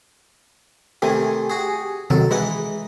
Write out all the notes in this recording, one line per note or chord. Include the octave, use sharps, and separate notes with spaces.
C3 D#3 A3 G4 G#5
F#4 G#4
C3 D#3 F#3 A4
E3 G#3 D#4 F#5